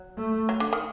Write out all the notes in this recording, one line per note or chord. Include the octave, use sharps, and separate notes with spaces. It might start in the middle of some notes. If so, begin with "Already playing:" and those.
Already playing: F#3
A3
F#3
D3
D#3